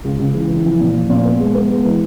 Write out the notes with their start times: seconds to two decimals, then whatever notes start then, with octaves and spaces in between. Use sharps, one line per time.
0.04 C#2
0.19 C#2
0.35 E3
0.50 E3
0.64 F3
0.80 A#2
0.94 F3
1.10 A#2
1.25 B3
1.40 G#3
1.55 B3
1.70 G#3
1.85 E3